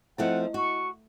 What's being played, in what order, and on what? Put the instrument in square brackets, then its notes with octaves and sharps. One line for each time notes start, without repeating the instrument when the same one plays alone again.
[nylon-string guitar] F3 A3 C4 [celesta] E4 D#5 [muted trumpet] F#5
[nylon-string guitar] F#4 [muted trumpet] C#6